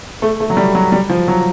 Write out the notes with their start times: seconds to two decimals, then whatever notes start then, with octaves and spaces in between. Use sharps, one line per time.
0.22 A3
0.40 A3
0.50 F#3
0.57 G3
0.75 F#3
0.92 G3
1.10 F3
1.28 F#3